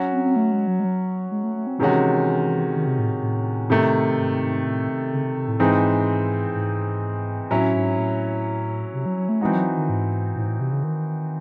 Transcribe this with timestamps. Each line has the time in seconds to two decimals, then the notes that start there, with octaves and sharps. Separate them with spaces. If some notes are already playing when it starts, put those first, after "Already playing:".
Already playing: F#3 C#4 F#4
0.12 C4
0.25 C4
0.36 A3
0.52 G#3
0.67 F#3
0.80 G#3
0.84 F#3
1.31 G#3
1.44 A3
1.56 A3
1.67 C4
1.79 C3 D#3 E3 G#3 C#4 F#4
2.75 D#3
2.87 C3
2.98 A2
3.22 A2
3.70 C3 D#3 A3
4.17 G#2
4.41 G#2
4.65 A2
4.89 C3
5.13 C#3
5.24 C3
5.36 C3
5.48 A2
5.60 G#2 E3 G#3 C4 D#4
6.55 G#2
7.51 A2 F#3 C#4 E4
7.75 G#2
7.98 A2
8.94 C3
9.06 F#3
9.17 F#3
9.29 A3
9.41 E3 G#3 C4 D#4 F#4
9.53 F#3
9.77 D#3
9.89 G#2
10.36 A2
10.42 G#2
10.48 A2
10.60 C3
10.72 C#3
10.83 D#3